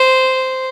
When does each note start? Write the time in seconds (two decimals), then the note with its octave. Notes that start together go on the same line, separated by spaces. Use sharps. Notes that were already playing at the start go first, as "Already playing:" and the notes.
Already playing: C5